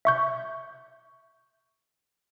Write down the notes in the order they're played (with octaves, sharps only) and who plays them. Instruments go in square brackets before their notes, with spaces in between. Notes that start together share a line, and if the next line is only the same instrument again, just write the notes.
[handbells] E5 C#6 G6